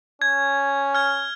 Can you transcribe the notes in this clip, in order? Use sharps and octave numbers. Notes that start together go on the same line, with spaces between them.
C#4 G#6
F6 G#6